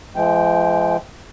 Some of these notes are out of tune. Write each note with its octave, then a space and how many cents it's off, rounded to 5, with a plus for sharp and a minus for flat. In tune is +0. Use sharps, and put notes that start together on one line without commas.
F3 -40 G#3 +25 G5 +0